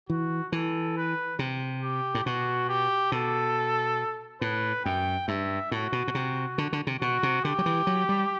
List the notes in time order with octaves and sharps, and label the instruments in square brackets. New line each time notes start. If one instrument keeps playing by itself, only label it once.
[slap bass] E3 [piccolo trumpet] F#4
[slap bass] E3 [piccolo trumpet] A4
[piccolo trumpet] B4
[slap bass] C3
[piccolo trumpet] G4
[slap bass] A2
[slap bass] B2 [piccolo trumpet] F#4
[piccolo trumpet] G4
[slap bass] B2 [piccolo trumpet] A4
[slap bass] A2 [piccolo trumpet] B4
[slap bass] F#2 [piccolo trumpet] G5
[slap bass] G2 [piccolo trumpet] E5
[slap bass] A2 [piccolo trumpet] F#4
[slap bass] B2
B2
C3
D3
D3
C3
[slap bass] B2 [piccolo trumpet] F#4
[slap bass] C3
[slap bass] D3 [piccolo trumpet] G4
[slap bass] F#3
E3
F#3
G3